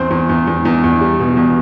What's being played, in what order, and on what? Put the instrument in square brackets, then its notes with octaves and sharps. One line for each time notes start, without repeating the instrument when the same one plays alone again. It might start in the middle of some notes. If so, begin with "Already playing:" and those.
Already playing: [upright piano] E2 C4 C5
E2
E2
E2
E2
E2
G3
B2
E2